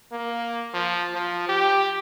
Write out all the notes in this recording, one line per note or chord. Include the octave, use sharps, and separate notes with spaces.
A#3
F3
F3
G4